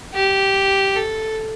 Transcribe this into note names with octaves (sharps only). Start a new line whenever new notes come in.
G4
A4